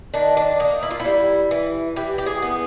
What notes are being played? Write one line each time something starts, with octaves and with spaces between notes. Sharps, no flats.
D#3 D4
D4
A#3 D#4
E4
F4
E4
G3
E3
E3 G4
G4
G#4
B3